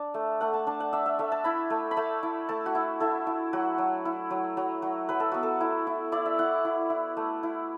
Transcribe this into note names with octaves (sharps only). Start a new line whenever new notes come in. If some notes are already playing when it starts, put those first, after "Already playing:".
Already playing: D4 A5
A3
A3 F#5
A5
D4 A5
F#5
D4 E5
E5
A3 E5
A5
E4 B5
A3
B5
A3 A5
E4
A3 A5
F#4
E4
E4 A4
E4
F#3 F#4
F#3
E4
F#3
F#3
F#3
F#3 B4
A4
B3 F#4
A4
E4
E4
E4 D5
E5
E4 F#5
E4
E4
A3
E4